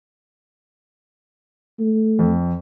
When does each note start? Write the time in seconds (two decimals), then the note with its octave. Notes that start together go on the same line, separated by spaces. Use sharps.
1.80 A3
2.19 F2